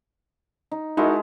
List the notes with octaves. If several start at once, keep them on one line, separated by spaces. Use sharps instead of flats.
D#4
G#3 D#4 E4 F#4 A4 A#4